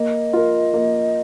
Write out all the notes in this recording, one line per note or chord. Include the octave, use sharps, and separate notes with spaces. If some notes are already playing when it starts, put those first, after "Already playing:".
Already playing: A#3 D#5
F4 A#4
A#3